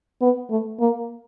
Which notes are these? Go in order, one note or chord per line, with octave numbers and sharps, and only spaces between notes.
B3
A3
A#3